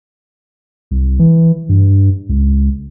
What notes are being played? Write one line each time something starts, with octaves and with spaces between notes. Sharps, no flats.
C2
E3
G2
C#2